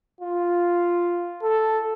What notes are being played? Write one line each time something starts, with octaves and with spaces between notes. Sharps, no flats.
F4
A4